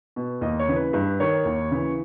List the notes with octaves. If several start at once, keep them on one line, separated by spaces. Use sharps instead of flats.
B2
D#2 D#5
C#5
C#3 E3
B4
G2 B4
D#3 C#5
D#2
C#3 E3